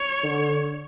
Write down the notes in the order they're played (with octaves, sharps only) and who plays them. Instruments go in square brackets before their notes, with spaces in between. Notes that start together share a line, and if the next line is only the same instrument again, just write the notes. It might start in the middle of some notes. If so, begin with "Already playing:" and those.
Already playing: [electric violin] C#5
[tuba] D3